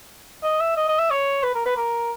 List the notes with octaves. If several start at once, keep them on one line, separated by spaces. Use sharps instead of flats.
D#5
E5
D#5
D#5
E5
C#5
B4
A#4
B4
A#4